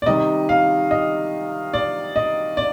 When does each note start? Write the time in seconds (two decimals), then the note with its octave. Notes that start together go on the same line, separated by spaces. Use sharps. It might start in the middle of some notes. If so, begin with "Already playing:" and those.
0.02 D5
0.06 C3 D#3 G3 D#5
0.49 F5
0.91 D#5
1.74 D5
2.16 D#5
2.57 D5